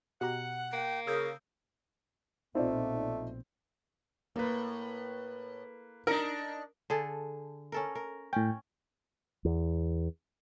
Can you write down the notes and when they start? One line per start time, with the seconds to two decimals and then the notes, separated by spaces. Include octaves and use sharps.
0.21 B2 G4 F#5 A#5
0.73 A#3 G5
1.07 C#3 A#4 D#6 E6 G6
2.55 A#1 B2 A3 C4 D#4 F4 D5
4.36 A2 A#3 B4
6.07 D4 D#4 A#4
6.90 D3 G#4 A4
7.72 C#4 A4 A#4
7.95 A#4
8.33 A2 C#4 G5
9.45 E2